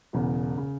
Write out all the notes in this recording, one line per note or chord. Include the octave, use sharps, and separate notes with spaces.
E1 E2 C#3
C#3